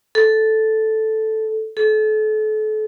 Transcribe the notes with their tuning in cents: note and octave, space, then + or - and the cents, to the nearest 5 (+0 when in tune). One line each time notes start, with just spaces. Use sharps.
A4 -5
A4 -35